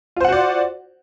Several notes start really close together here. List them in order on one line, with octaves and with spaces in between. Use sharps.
F4 C5 F#5 F#4 D5